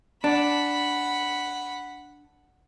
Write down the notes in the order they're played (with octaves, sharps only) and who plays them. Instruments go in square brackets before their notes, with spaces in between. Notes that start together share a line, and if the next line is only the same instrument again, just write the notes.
[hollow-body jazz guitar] D4 [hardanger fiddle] F#5 B5